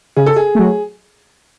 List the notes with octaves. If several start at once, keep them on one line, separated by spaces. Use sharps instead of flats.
C#3 G#4
A4
G#4
F#3 A3